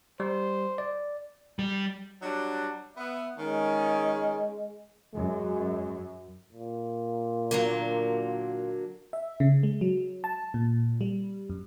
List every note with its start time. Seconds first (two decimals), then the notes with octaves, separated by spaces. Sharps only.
0.20 G3 C5
0.78 D5
1.59 G3
2.22 F#3 G3 D4
2.97 B3 E5
3.38 D#3 G#3 C#4
5.14 F#2 G#3
6.52 A#2
7.51 D3 F#3 A#3
9.13 E5
9.40 C#3
9.63 G#3
9.81 F#3
10.24 A5
10.54 A#2
11.01 G3
11.50 F#2